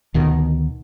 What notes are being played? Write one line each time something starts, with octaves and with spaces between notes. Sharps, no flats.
D2 B2 D#3